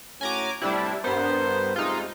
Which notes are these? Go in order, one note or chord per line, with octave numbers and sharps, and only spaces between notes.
A2 C#4 F#4 G#5 A#5 D6
A2 C3 G3 C4 D4 E4
G2 B3 A#4 C5
C3 G#3 A3 D#4 F4